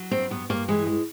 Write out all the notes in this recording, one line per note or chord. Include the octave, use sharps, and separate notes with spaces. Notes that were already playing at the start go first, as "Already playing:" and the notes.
Already playing: F#3
G2 C4
G2 B3
G2 A#3
E3 G#3
G#3